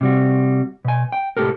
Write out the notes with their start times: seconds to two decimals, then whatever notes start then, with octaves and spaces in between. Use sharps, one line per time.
0.01 C3 G3 F#4
0.85 B2 G#5
1.12 G5
1.37 C2 A2 G4 A4 A#4